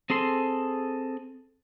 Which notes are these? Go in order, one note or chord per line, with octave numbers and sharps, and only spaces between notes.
C4 G#4 A4 C6